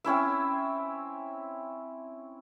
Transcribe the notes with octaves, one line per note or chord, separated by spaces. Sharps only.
C4 C#4 E4 E5